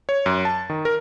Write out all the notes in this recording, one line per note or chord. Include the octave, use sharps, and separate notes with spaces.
C#5
F#2
A5
D#3
A#4